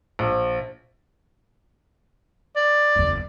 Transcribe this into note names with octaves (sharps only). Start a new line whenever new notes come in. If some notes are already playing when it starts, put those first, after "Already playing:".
A#1
D5
F#1 E2